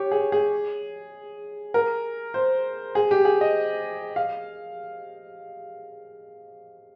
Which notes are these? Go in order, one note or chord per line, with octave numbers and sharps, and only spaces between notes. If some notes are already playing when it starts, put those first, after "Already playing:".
Already playing: G4 C#5
G#4
G#4
A#4
C5
G#4
G4
G#4
D#5
F5